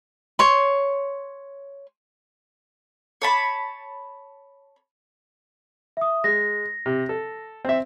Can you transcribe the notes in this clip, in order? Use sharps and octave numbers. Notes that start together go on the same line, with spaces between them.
C#5 C6
C#5 A5 B5
E5 D#6
G#3 A#6
C3
A4
C4 E5